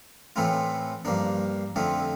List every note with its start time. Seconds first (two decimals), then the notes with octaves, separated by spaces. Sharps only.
0.36 A2 E3 A3 C4 F4
1.05 G2 F3 A#3 D4
1.76 F2 D3 A3 C4 F4